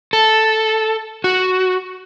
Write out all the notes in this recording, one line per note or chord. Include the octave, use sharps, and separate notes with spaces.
A4
F#4